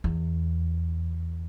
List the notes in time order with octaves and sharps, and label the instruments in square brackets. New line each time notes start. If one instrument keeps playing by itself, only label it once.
[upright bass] E2